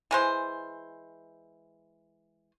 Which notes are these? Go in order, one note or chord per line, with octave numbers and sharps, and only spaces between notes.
E3 G#3 C5